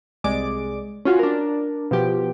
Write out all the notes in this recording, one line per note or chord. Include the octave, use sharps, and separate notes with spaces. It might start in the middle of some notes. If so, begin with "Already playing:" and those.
C2 G#3 D5 D6
C#4 F4 F#4
D4 A#4
B2 F3 G4